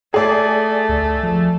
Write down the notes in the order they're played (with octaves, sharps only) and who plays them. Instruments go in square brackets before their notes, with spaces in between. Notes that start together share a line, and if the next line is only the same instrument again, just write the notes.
[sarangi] A3 [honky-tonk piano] G#4 D5
[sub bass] D2
F3